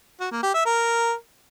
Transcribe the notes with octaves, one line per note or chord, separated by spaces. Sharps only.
F#4
A#3
G4
E5
A#4